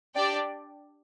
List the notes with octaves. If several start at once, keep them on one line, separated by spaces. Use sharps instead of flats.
D4 G4 D5 G5